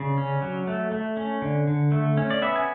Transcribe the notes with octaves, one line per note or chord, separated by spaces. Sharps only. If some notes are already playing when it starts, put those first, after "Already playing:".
Already playing: C#3 D5
C#4
F#3
A3
A3
C#4
D3
D3
A3
C#4
D5
B3 E5
G#5